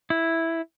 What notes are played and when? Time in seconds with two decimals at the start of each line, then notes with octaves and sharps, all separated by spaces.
0.10 E4